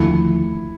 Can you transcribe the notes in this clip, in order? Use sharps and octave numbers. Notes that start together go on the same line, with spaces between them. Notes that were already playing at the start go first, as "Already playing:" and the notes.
Already playing: D#2 D3 F3 A3 E4